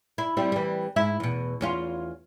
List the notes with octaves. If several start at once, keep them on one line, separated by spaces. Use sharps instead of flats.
E4
G3 C4 E4
E3 G3
G#2 E4 E5
E2 B2
E2 C#4 F4